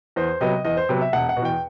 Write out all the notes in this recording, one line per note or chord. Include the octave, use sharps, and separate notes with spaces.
E2 C5
C3 F#3 B3 D#5
E2 D#5
C5
C3 F#3 B3
E5
E1 F#5
F#5
B2
E2 G5